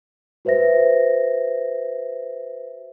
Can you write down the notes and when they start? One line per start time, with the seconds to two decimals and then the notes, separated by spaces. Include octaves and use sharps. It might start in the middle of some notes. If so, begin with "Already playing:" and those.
0.45 F#4 B4 C5 E5 A#6